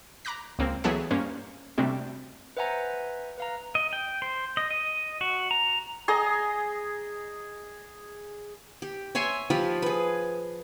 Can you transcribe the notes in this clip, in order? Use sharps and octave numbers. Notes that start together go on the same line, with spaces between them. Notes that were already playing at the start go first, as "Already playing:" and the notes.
A#5 B5 D6 F#6 A#6
C#2 A#3 C4
E3 F#3 B3 G#4 A4 E5
G2 A#3 C#4 C5
C3 G3 A3 C4 D4 F#4
B4 C5 E5 F#5 G#5 A#5
B4 F5 A#5
D#5
G5
C5
D#5
D#5
F#4
A#5
G#4 D#5 A#5 D#6
G4
C#5 E5 G#5 C6
F3 F4 G4 B5
G#4 B4